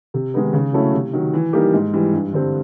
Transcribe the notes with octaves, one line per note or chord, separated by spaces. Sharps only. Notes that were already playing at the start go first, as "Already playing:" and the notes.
C3
D#3 G#3 B3 D#4
C#3
F#3 A3 C#4 E4
C3
D#3 F#3
E3
G3 A#3 D#4 G4
G#2
E3 G3
G2
D3 G3 C4